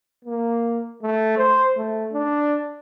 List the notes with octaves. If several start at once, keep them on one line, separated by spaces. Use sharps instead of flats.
A#3
A3
C5
A3
D4